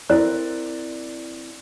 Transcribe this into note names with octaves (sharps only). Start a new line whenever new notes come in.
C4 E4 A#4 D5 F#6